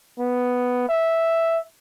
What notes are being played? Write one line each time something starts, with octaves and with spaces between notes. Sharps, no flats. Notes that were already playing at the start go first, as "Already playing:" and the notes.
B3
E5